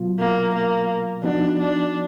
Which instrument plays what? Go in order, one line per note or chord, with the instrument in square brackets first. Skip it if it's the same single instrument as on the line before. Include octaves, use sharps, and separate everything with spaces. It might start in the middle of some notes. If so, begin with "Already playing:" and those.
Already playing: [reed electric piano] B2 F#3 B3 F4
[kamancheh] A#3
A#3
[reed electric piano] F3 B3 D#4 F#4 [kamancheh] D4
[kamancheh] D4